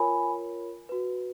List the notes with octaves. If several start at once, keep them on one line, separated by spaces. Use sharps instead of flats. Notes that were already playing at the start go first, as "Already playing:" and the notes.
Already playing: F4 A#4 C#5 G#5 B5
F#4 B4